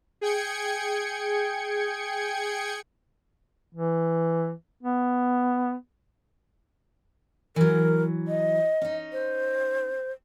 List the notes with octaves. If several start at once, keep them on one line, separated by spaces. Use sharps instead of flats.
G#4 G5 G#6 C#7
E3
B3
E3 F#3 A#4
D#5
C#4 D#4
C5